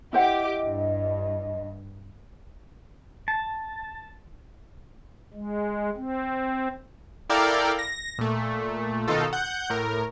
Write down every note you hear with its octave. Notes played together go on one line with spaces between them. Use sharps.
E4 G4 C5 D#5 F#5 D6
G2
A5
G#3
C4
E4 A4 A#4 D5 F5 G5
A#6
A#2 A3
B2 D#3 D#4 F4 A4
F#5 G6
A2 A#4